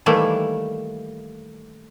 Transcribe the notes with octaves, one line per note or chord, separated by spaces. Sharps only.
D#3 E3 G3 A3 A#3 E4